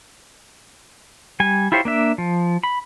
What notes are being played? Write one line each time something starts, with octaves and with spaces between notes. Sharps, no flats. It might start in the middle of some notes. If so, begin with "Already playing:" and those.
G3 G#5
E4 F4 G4 C5 C#5
A#3 D4 E5
F3
B5